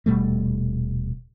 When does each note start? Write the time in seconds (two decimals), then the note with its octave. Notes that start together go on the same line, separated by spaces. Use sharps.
0.06 D#1 B2 G3 A3